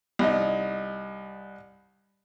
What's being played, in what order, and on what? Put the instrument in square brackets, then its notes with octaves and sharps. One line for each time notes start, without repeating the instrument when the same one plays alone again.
[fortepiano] C2 D#4